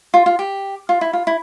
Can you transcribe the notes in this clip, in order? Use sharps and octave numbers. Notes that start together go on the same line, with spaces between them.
F4
F4
G4
F4
E4
F4
E4